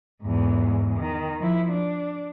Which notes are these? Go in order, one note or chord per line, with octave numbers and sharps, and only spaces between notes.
E2 G#2
D#3
F3 E4
D4